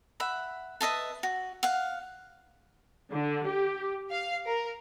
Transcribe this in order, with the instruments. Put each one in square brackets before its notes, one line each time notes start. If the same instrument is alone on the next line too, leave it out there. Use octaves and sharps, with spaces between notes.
[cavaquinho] E5 F#5 B5
B4 D#5 E5 A5
F#4
F5 F#5
[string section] D3
G4
F5
A#4